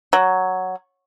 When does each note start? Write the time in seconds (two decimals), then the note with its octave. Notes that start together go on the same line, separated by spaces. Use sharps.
0.13 F#3